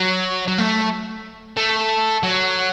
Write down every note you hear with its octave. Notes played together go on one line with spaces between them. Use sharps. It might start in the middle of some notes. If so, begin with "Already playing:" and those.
Already playing: F#3
F#3
A3
A3
F#3